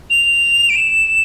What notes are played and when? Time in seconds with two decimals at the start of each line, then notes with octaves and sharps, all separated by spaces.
0.10 F7
0.70 D7
0.76 E7